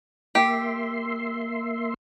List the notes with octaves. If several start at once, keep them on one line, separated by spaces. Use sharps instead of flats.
A#3 G4 E5 C6